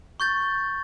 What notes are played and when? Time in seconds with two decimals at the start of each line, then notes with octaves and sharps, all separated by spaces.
0.20 C#6 G6 A6